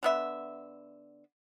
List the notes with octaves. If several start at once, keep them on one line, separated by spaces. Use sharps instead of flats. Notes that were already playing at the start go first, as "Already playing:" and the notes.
D3 B3 E5